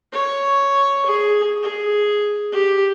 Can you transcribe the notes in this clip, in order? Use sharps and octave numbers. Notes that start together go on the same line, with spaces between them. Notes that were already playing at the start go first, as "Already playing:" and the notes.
C#5
G#4
G#4
G4